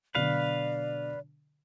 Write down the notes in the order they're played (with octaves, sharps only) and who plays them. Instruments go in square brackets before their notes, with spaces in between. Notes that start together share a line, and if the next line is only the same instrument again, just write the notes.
[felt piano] B2 D3 F#3 [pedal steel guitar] B4 F5 [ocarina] D5